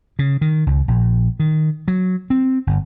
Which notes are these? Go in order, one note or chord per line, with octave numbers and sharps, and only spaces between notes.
C#3
D#3
C#2
A#1
D#3
F#3
C4
G1